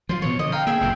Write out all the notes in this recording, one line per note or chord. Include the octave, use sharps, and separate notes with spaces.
F3 F#3 F4
B2 E3 F3 C#5
D3 D#5
F5 G5 A#5
A#3 G#4 E5 G5
F#1 F2 A#2